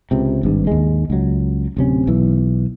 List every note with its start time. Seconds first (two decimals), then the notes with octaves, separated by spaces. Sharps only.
0.11 C#2 C3
0.43 G#1 G2
0.67 D#2 G#2 G#3
1.10 C#2 F#3
1.77 D1 C3 C#4
2.07 B1 E3